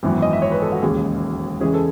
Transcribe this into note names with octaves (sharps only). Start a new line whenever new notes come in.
G#1 F#2 E3 B3
D#5
E5
C#5
B4
A4
F#4
E1 D#2 C#3 G#4
E2 C#3 E3 G#3 C#4 G#4
A4